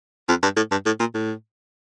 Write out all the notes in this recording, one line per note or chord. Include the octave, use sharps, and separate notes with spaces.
F2
G2
A2
G2
A2
A#2
A2